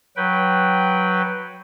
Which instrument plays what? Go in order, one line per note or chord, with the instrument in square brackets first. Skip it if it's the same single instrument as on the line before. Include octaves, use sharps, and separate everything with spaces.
[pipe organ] F#3 B4 G5